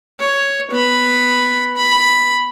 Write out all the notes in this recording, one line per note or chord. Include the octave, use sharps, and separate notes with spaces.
C#5
B3 B5
B5